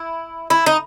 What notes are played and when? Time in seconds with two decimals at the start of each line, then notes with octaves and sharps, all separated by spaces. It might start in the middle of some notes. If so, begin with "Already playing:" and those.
Already playing: E4
0.50 E4
0.66 D#4